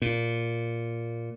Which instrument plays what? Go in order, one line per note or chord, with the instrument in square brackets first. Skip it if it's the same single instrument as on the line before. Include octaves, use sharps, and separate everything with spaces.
[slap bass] A#2